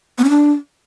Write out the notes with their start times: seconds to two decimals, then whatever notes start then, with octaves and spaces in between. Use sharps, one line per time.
0.18 B3
0.24 C#4
0.30 D4